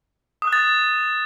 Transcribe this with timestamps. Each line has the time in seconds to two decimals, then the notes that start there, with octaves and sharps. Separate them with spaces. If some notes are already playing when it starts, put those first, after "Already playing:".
0.42 D#6
0.47 F#6
0.53 A6